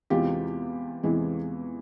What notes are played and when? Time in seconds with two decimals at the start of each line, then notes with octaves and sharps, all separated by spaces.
0.10 E2 C3 E3 G#3 F4 G4
1.03 E2 C3 E3 G#3